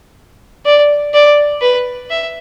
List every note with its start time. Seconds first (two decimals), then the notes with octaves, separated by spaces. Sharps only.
0.66 D5
1.14 D5
1.61 B4
2.10 E5